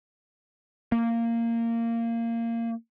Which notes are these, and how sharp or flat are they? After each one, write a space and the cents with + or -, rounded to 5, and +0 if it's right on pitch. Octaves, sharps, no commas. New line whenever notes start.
A#3 -15